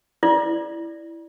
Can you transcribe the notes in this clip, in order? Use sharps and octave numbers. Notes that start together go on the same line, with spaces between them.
E4 D5